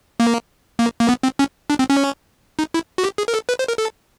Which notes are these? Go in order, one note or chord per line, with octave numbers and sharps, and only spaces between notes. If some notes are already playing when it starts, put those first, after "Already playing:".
A#3
A#3
A#3
B3
C4
C#4
D4
C4
C#4
D#4
E4
F#4
G4
G#4
A#4
A4
B4
C5
A#4
A4